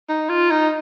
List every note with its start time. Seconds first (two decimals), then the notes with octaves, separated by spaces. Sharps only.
0.09 D#4
0.29 F4
0.51 D#4